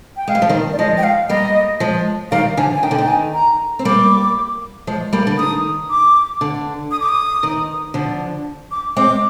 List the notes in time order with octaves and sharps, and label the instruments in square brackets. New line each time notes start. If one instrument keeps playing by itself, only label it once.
[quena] G5
[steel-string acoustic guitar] G#3 [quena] F5
[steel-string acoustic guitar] G3
F3
D#3 G3
[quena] D5
[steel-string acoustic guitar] F3 G#3 [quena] D#5
[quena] G5
F5
[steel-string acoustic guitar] G3 A#3 [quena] D#5
[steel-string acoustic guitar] F3 G#3
[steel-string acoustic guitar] D#3 G3 [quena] F5
[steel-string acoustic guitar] D3 F3 [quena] G#5
[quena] G#5
[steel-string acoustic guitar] D#3 [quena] G5
[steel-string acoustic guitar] D3
[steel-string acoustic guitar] D#3 [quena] G5
[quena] G#5
A#5
[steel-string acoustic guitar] C4
[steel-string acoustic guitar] G3 A#3 [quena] D6
[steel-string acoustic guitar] F3 G#3
G3 A#3
D3
[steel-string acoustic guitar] D#3 [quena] D#6
[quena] D6
[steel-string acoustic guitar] D3
[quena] D#6
D6
D#6
[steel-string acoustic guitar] D#3
D3 F3
[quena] D6
[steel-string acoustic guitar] G#3 C4 [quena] D6